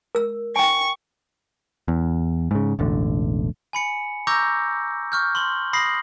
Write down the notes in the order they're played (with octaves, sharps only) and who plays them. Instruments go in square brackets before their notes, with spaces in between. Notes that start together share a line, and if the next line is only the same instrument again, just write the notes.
[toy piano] A#4 E6
[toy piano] G5 G#5 [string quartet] C#6
[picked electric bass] E2
G#2 C#3
E1 A1 D3
[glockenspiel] G#5 B5 C#7
A#5 C#6 D6 E6 G6 A#6
C#6 F6 G6
C6 F#7 G7
B5 D#6 A#6 C7 F#7